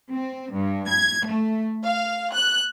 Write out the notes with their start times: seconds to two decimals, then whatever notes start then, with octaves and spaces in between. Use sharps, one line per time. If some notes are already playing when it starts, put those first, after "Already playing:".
0.12 C4
0.52 G2
0.88 G#6
1.25 A3
1.85 F5
2.35 F#6